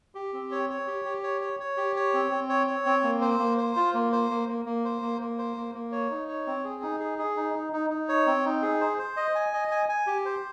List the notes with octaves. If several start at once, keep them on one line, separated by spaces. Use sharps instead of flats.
G4
C4
C#5
C#5
G4
G4
C#5
C#5
C#5
G4
C#5
C4
C4
C#5
C#5
C4
A#3
C5
A#3
C5
F4
A#3
C5
A#3
A#3
A#3
C5
A#3
A#3
C5
A#3
A#3
C#5
D#4
C#5
C4
G#4
D#4
G#4
G#4
D#4
D#4
D#4
D#4
C#5
C4
D#4
G#4
C5
C5
D#5
G#5
D#5
G#5
G#5
G4
C5